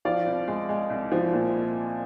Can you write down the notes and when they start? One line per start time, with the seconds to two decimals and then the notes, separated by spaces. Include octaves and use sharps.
0.05 F3 D5 F5
0.27 C2
0.48 G#3
0.69 G#3
0.90 C2
1.12 F3
1.33 A#2